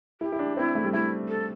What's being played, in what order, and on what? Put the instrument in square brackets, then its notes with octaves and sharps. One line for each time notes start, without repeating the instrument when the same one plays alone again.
[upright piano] E4 [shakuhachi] G4
[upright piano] E4
D4
[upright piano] C4 [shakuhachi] E4
[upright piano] A3
G3
[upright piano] A3 [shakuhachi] E4
[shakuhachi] A4